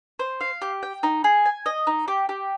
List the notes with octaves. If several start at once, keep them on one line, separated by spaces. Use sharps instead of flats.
C5
F5
G4
G5
D#4
G#4
G#5
D#5
D#4
G4
G4